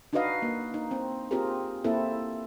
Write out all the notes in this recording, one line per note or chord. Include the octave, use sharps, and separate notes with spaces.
D4 D#4 F#4 B4 D#5 F5
A#3
D#4
C4
C4 F4 G4 G#4 A#4
A#3 C4 E4 A4